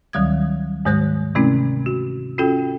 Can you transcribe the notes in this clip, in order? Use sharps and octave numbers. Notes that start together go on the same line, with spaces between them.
D2 D#3 F#3 G3 D#6 G#6
G#2 D#3 G#3 C5 D#6 F#6
C3 E3 A3 C4 C#4 E4
F#4
C#4 F4 F#4 A4 G5